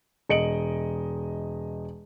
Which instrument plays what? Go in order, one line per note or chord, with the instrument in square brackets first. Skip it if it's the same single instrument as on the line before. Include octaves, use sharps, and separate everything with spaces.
[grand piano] E1 D#5 C#7 D7 F#7